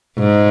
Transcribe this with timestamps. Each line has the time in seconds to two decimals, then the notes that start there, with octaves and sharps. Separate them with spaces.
0.18 G#2